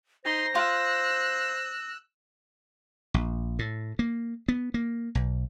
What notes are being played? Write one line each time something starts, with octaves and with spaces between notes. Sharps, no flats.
D#4 C5 C6 A#6
F4 E6 F#6
A#1
A2
A#3
B3
A#3
B1